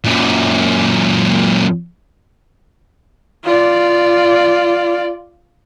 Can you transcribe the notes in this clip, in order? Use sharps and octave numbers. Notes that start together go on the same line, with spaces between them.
F#2 A#2
F4 D5